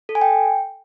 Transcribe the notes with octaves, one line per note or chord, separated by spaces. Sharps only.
A4
G#5
G5